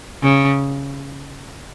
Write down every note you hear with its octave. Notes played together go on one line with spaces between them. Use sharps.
C#3